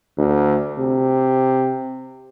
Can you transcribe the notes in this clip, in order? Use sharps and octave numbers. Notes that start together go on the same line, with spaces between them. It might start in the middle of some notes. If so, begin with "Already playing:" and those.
D2
C3